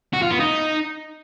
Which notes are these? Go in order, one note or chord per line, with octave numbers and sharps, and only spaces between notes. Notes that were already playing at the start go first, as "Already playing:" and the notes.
F#4
F4
B3
D#4